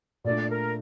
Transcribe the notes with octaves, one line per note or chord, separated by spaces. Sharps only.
A#2 A3 D4 D5
A#4